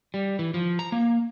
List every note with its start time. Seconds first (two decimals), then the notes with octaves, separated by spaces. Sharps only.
0.14 G3
0.39 E3
0.54 F3
0.79 A#5
0.92 A#3